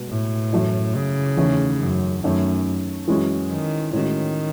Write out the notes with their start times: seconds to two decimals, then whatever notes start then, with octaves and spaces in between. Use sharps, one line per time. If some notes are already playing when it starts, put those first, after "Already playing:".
Already playing: B2 G#3 B3 F#4
0.09 A2
0.52 F#2 E3 A3 E4
0.95 C#3
1.37 E2 D#3 A3 C#4
1.80 F#2
2.23 F#2 D#3 A3 C#4
3.08 F#2 E3 G#3 C#4 F#4
3.50 D#3
3.93 A2 D#3 G#3 C#4 F#4